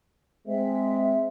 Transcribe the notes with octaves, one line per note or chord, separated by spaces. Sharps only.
G#3 C4 E5